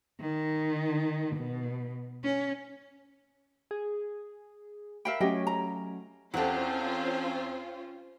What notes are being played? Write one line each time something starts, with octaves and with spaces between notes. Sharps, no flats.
D#3
B2
C#4
G#4
A#4 E5 F5 G5 B5
F#3 A3 C#4 G4 D#5 G5
A#5
E2 C4 C#4 F4 G4 A4 C5 F#5